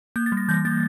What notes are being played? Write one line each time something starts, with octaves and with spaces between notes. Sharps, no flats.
A#3 G6
A6
G3
A#6
E3 G6
A#3 A6